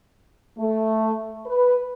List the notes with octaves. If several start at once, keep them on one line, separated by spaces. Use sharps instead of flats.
A3
B4